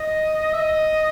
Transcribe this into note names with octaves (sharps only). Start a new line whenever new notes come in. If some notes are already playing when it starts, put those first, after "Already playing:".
Already playing: D#5
E5
D#5